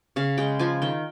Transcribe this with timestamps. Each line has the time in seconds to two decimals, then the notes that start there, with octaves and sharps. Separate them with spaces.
0.16 C#3 F5
0.38 G#3 G5
0.59 F3 G#5
0.82 D#3 G5